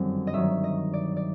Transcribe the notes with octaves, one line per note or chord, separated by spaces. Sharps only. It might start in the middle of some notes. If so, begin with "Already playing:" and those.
Already playing: G1 F#2 D#3 G3 C4
D#5
G2 D#3 F#3 E5
D#5
D5
D5